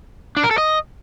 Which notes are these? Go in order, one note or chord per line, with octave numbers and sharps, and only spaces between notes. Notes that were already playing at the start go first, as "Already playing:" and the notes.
D4
A#4
A4
D#5